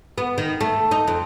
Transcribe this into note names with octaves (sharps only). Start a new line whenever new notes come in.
B3
D#3
A3
D#4
F2